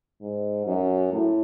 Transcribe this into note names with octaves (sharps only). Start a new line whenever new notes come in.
G#2
F#2
A2